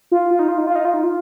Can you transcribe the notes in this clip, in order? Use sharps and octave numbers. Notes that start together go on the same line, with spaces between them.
F4
F4
D#4
F4
D#4
F4
D#4
F4
D#4
F4